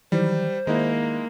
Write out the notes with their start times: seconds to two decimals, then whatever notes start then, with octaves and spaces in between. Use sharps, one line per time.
0.12 D#3 E3 F#3 G3 C5
0.67 D#3 G#3 A#3 D#4 E4